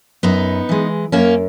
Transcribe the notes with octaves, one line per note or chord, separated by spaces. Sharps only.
F#2 B3 D#4
E3 G#3
F#2 A#3 C#4